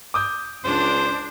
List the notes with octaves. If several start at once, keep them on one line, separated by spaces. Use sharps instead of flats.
D6 D#6 G6
C#2 D4 C5